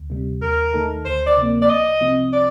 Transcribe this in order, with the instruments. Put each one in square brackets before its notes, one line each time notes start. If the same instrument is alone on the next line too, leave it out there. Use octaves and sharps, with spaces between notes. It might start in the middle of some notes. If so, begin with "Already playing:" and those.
Already playing: [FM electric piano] D2
C3 G3
[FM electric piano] D#2 [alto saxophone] A#4
[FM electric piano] D#3 A3 D#4 A4
[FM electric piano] D2 [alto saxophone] C5
[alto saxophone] D5
[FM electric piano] C3 F3 A#3
[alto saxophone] D5
[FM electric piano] C2 [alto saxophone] D#5
[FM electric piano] C3 F3 C4 F4
[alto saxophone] D5